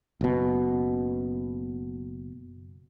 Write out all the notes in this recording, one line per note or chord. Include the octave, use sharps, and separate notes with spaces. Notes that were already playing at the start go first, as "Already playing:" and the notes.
F#1 B2